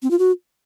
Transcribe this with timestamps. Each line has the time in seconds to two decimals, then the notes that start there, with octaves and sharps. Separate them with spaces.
0.02 C4
0.11 F4
0.19 F#4